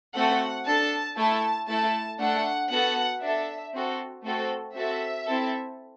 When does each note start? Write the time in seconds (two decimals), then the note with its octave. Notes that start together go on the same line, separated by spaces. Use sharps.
0.15 A3 C4 F#4 A4 F#5
0.66 D4 A4 A5
1.17 A3 E4 A4 A5
1.69 A3 E4 A4 A5
2.20 A3 D4 A4 F#5
2.71 B3 F#4 A4 F#5
3.22 D4 A4 E5
3.74 C4 F#4 A4
4.24 A3 C4 F#4 A4
4.76 C4 F#4 A4 E5
5.27 C4 E4 A4